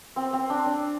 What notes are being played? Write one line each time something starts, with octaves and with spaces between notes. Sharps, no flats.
C4
C4
D4
D4